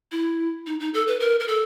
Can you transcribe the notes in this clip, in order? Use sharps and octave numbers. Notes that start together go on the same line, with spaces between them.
E4
D#4
D#4
A4
B4
A#4
A#4
A4